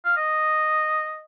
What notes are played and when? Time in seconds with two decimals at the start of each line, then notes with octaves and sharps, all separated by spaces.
0.05 F5
0.17 D#5